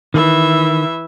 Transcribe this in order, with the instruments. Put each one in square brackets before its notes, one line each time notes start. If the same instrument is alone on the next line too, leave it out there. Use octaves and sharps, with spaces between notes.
[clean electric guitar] D#3 [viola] E3 E5